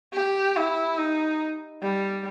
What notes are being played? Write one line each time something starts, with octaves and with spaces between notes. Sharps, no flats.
G4
E4
D#4
G3